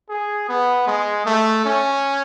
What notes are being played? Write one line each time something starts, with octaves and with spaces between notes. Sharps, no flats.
G#4
B3
G#3
A3
C#4